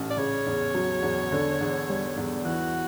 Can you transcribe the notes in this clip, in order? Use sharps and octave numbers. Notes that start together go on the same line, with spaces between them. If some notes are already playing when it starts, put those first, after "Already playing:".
Already playing: A1
D5
C#3 C#5
E2
F#3
E2
D3
E2
G3
E2
E3 F#4